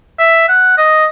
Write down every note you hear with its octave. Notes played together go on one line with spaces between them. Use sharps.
E5
F#5
D#5